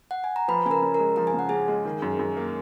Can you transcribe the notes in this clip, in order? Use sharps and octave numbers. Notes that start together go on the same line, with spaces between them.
F#5
G#5
A#5
F3 B4 B5
C#3 A#4 G#5 A#5
C#4
A#4 A#5
G#3
F3 A#5
G#5
C#3 F#5
C#4 G#4 G#5
G#3
D#3
F#2
F#2
A#3